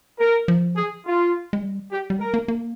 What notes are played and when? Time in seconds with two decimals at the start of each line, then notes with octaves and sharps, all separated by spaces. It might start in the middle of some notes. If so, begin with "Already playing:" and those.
0.19 A#4
0.48 F3
0.76 G#4
1.06 F4
1.53 G#3
1.62 G3
1.91 G4
2.10 G3
2.20 G#3 A#4
2.34 A#3
2.48 A#3